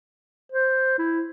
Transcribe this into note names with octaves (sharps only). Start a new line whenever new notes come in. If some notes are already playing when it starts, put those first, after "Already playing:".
C5
E4